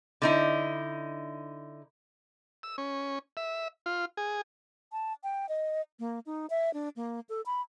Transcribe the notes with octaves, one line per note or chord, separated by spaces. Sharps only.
D3 D#4 E4
E6
C#4
E5
F4
G#4
A5
G5
D#5
A#3
D#4
E5
D4
A#3
A4
B5